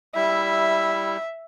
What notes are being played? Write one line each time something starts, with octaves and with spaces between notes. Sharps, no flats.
G3 E4 E5